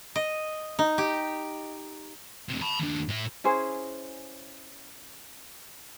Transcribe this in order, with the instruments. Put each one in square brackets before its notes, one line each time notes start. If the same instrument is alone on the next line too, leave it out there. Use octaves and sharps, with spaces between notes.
[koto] D#5
D#4
G4
[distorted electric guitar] E2 C3
A5 B5
D#2 D4
A2 E5
[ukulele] C#4 E4 G#4 C5